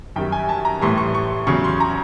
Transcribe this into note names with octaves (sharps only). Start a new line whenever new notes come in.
F#2 D#3 G3 G5
G#5
A5
A#5
A2 E3 G3 C6
C#6
C#6
E2 C#3 F#3 C#6
C6
A#5